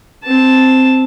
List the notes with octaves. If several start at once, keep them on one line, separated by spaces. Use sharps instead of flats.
C4 A5